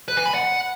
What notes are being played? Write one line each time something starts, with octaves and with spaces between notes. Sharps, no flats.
B4
G#5
B5
F#5